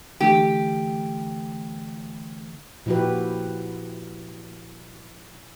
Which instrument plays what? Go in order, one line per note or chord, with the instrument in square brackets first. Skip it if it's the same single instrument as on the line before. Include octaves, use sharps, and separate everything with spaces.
[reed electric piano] D3 E3 A3 [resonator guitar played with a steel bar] G4
[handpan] A#2 F3 E4 F#4 G4 B4